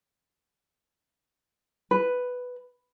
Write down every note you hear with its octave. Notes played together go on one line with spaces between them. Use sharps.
B4